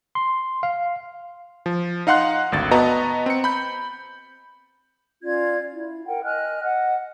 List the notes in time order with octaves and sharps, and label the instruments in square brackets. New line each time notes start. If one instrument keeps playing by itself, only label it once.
[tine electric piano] C6
F5
[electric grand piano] F3
D#4 F5 F#5 C6 F#6
G#1 D2 A6
B3 F#4 B4 D#5 A5 A#5
C4 C#7
B5 G6
[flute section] C#4 F4 D5 G#6
E4
A#4 F#5 G5
D#5 G#5 F6 F#6
D#5 F#5